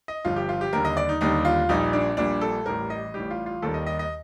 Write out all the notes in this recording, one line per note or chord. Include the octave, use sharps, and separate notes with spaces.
D#5
G1 G2 F3 F4
G4
F4
G4
D#2 D3 G3 A#4
D#5
D5
D#4
D#2 D3 G3 D#4
F4
A#1 A#2 G3 D#4
D4
A#1 A#2 G3 D4
A4
A1 A2 G3 A#4
D#5
A1 A2 G3 G4
F4
F4
D#2 D#3 G3 A4
D#5
D#5
D#5